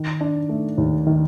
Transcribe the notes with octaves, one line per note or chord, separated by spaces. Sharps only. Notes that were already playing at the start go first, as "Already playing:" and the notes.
Already playing: D#3
D4
A3
D#2
D#3